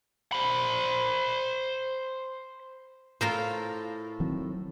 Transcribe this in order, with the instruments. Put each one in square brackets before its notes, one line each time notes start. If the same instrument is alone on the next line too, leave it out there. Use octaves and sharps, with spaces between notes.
[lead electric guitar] C5 B5
[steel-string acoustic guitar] A2 A4 [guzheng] F4 A#4 C5
[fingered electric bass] D#3 F#3 C4